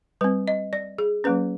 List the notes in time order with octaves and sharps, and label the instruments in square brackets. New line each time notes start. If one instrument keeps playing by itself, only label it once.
[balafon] G3 C4 B4
D#5
D5
G#4
F#3 A#3 C#4 B4